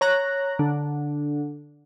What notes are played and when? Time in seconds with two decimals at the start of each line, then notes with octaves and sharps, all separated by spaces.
0.01 C#5 A#5 F#6
0.59 D3